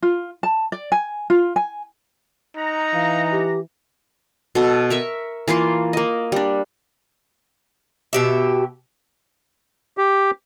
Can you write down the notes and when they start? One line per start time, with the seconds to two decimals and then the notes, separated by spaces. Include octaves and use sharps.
0.03 F4
0.43 A5
0.72 D5
0.92 G#5
1.30 F4
1.56 G#5
2.57 D#4 F#5 A#5
2.94 E3 F5
3.32 G4
4.55 B2 A4
4.90 A#4 E5 C#6
5.48 E3 A#3 F4 C6
5.93 A#3 D#5
6.32 G3 D4
8.13 B2 G4 E5
9.98 G4